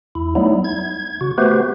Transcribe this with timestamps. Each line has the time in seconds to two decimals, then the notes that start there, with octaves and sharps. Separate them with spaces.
0.15 E2 E4
0.35 F#3 G3 A3 B3 D#4 E4
0.64 G#6
1.21 C#3 F#4
1.38 A3 B3 F#4 G4 B4 C5